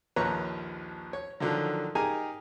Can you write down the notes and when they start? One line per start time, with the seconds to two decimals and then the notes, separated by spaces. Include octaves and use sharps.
0.16 A#1 D#2 F3 B4 C#5 A#5
1.13 C#5
1.40 D3 D#3 F3 F#3
1.95 D#4 G4 G#4 A#4 G#5 A#5